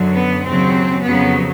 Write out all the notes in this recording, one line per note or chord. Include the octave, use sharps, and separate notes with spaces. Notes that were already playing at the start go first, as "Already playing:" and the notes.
Already playing: F#2 D3 F#3
B3
D#2 C#3 F#3 C4
F2 C#3 F#3 B3